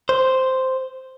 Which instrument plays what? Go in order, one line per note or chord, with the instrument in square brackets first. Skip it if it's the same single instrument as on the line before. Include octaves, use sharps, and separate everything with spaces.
[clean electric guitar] C5